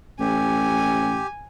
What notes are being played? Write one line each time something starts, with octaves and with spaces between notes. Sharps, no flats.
A1 G4 G#5